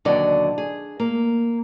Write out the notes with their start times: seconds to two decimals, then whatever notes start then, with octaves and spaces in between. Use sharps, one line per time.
0.05 D#2 B2 D3 F#3 D#4 D5
0.58 G#4
1.00 A#3